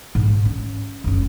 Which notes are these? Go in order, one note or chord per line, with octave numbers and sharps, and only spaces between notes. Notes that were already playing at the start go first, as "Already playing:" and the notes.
G#2
C#4
F#1 C#4